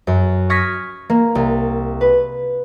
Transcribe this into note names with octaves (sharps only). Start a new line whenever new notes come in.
F#2
C#6 D#6 F6 G#6 A#6 B6
A#3
C2
B4